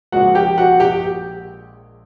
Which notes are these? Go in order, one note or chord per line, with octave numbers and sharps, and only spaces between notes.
A#1 A#2 F3 G#3 F#4 F#5
G4 G5
F#4 F#5
G4 G5